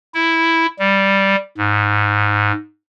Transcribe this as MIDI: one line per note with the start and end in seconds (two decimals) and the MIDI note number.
0.14 0.67 64
0.79 1.36 55
1.58 2.52 44